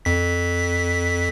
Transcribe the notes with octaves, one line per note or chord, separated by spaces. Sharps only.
F2 B6